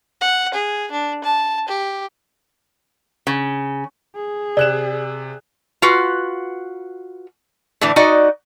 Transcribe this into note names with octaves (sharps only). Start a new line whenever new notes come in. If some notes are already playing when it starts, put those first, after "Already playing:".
F#5
G#4
D4
A5
G4
C#3
G#4
C3 D5 F#6 E7
F4 F#4 B4
A2 D3 E3 D4
D#4 F#4 D5 D#5